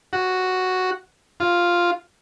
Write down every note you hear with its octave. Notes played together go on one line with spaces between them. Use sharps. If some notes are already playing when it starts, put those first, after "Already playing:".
F#4
F4